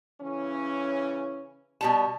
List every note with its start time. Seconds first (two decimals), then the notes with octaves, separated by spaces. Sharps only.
0.22 C#3 E3 C#4
1.81 B2 G3 A5